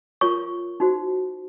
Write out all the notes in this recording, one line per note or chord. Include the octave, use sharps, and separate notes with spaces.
F4 A#4 C#5 C#6
D#4 F#4 C5